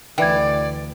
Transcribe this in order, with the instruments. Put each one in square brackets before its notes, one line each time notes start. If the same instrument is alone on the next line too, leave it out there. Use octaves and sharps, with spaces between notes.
[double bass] D2 [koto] E3 [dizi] D5 [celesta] G5 G#6